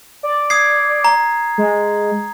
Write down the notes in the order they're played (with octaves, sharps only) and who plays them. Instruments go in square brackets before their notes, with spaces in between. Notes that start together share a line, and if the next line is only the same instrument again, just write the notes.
[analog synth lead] D5
[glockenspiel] D#6 G#6 C7
A#5
[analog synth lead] G#3